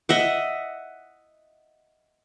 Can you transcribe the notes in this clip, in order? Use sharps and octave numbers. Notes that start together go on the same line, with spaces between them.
D#5 E5 F#5